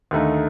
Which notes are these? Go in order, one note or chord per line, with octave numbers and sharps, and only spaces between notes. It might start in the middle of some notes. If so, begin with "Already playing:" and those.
D#2 D3 A3 D#4